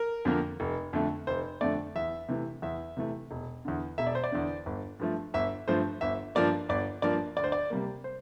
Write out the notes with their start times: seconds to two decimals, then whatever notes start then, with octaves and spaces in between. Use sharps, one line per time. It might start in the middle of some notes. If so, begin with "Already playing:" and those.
Already playing: A#4
0.25 F2 D3 F3 A#3
0.60 F1
0.93 F2 D3 A3
1.27 F1 C5
1.61 F2 D3 A3 D5
1.96 E2 E5
2.29 C3 E3 A3
2.62 E2 E5
2.97 C3 E3 A3
3.31 E1
3.65 E2 D3
3.98 E1 E5
4.07 D5
4.15 C5
4.24 D5
4.32 E2 D3
4.66 G1
4.99 G2 F3 A3
5.34 G1 E5
5.68 G2 F3 A3 C5
6.01 G1 E5
6.35 G2 F3 A#3 D5
6.69 G1 D5
7.02 G2 F3 A#3 D5
7.36 D2 D5
7.44 C5
7.52 D5
7.70 C3 G3 A#3
8.04 C5